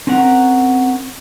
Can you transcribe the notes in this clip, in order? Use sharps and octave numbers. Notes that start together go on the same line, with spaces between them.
C4 C#4 A#4 F#5 A#5